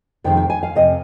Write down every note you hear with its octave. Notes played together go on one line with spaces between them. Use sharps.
F2 C3 D#3 G#3 G5
G5
G#5
F5
F2 C3 D#5